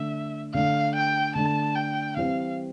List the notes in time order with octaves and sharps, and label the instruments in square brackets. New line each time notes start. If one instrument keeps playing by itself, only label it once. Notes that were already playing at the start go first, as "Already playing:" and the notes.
Already playing: [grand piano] D3 A3 D4 [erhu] E5
[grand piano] D3 A3 D4 [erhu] F5
[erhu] G5
[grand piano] D3 A3 D4 [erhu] A5
[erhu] G5
[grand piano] E3 G3 C4 [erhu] F5